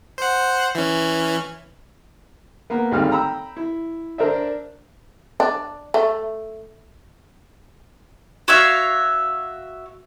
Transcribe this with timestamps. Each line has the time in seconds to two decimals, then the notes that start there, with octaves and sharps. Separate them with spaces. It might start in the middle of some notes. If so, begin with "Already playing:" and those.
0.18 C5 F#5
0.75 E3 C#4
2.70 A#3 B3
2.91 G#1 D2 G3 D#4 F5 F6
3.11 G5 A#5 B5 E6
3.56 E4
4.18 D4 A#4 C5 D5 E5
5.40 D4
5.94 A3
8.48 F#4 C#5 E5 F5